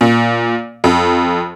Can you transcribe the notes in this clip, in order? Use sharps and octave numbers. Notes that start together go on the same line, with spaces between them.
A#2
F2